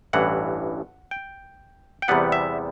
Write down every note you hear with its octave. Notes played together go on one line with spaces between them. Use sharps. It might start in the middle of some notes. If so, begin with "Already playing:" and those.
A1 G2 E3 F#5
G5
G5
E2 C3 G3 B3 F#5
E5